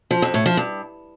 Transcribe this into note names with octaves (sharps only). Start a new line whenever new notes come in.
F3
F2
A2
F3
G2